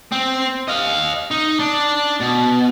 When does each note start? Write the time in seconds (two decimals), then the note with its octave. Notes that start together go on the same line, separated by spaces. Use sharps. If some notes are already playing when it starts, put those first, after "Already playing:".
0.12 C4
0.68 D#5 F5
1.31 D#4
1.59 D4
2.20 B2